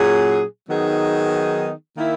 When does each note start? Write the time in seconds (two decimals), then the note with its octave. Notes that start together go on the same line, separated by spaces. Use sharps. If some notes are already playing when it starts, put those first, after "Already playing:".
Already playing: A#2 F#3 C#4 G#4
0.68 D#3 F#3 B3 D#4 G#4
1.96 D#3 A#3 E4